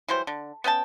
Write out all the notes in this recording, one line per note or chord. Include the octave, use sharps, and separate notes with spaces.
E3 F#3 G3 C5
D3
B3 C#4 G5 A5